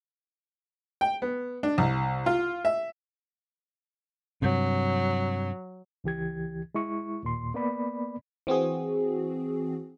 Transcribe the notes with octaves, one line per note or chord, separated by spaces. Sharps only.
G5
B3
D4
C2
F4
E5
G2 C3 F#3
C#2 E3 G4 G#6
G#3 E4 C#6
D#2 A#2 C6
A#3 B3 D5 B5
E3 C4 F#4 G#4